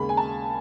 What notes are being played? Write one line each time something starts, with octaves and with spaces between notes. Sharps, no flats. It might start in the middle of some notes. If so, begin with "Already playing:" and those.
Already playing: D#2 C#3 G#3 B5
G#5
A5